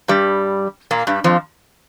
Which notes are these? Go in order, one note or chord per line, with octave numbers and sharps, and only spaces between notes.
G2 G3
A#2 A#3
G2 G3
F2 F3